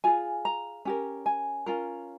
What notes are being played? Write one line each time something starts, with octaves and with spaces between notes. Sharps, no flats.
F4 G#4 G#5
A#5
C#4 G4 A#4
G#5
C#4 F4 A#4